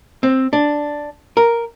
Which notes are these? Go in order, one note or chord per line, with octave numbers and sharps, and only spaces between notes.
C4
D4
A#4